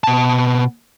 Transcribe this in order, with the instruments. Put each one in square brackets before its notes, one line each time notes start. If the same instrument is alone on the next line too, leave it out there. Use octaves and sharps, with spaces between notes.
[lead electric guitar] B2 A5